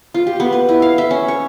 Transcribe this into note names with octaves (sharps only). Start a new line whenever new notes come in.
F4
G4
B3
B4
E4
F5
E5
C#4
C#5